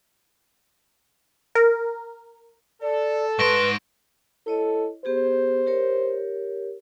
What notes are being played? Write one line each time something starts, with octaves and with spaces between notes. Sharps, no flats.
A#4
A4 D5
G#2 B4 C6 C#6 A#6 D7
E4 A4 C#5 D#5
B3 G4 G#4 C5
G4 A#4 C#5